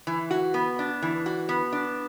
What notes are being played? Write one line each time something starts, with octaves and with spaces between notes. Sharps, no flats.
E3
F#4
B3
D4
E3
F#4
B3
D4